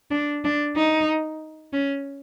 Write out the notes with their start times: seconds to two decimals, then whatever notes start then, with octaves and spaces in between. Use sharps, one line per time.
0.11 D4
0.44 D4
0.76 D#4
1.73 C#4